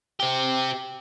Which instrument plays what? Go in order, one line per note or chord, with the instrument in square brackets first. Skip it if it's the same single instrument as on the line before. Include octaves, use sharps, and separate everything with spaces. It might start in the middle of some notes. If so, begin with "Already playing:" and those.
[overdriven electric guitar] C4 G4